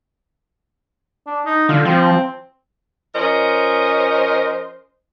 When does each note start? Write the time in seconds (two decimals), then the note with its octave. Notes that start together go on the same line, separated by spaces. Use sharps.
1.26 D4
1.45 D#4
1.69 D3 F4
1.85 F3 C4
3.15 F3 C#4 A#4 C5 D#5